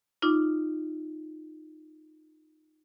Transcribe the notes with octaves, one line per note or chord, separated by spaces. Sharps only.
D#4 F4 D6